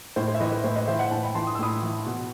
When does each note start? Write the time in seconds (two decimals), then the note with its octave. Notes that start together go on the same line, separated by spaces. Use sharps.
0.16 A2 C5
0.28 C5
0.34 E5
0.40 E3 B4 D#5
0.52 B4
0.64 A2 C5
0.76 B4 D#5
0.88 E3 C5 E5
0.99 D#5 F#5
1.11 A2 F#5 A5
1.23 G5 B5
1.35 E3 A5 C6
1.47 D#6
1.55 E6
1.59 A2 B5 D#6
1.83 E3
2.06 B2